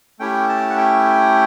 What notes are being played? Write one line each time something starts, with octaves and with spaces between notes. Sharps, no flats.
A3 C#4 E4 G4 G5
A5
F#5
G5